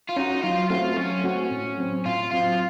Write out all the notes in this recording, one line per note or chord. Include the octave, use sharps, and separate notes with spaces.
F4
C#4 D#4 F#4
F#3 F4
A3 C4 F4 F#4
F#3 C#4
A3 C4 F#4
A2
F#3 C4
A2 F4
F#3 C4 F4